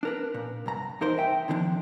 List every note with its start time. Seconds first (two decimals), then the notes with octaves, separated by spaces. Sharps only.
0.03 D4 A#4 B4
0.35 A#2
0.66 C2 G2 A#5
1.01 E2 D#4 A#4 C5
1.18 E5 G5
1.48 D3 D#3 F3 C4 D4